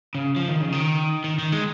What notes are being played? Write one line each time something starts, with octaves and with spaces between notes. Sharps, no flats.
C#3
F3
D#3
C#3
D#3
D#3
D#3
G#3